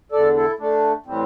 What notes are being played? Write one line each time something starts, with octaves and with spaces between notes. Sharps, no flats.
E2 D3 A4 D5
E4 A4
A3 D4
A2 E3 G3 C4